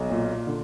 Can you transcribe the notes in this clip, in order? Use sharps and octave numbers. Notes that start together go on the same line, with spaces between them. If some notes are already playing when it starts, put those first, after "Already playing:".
Already playing: B1
A#2
D3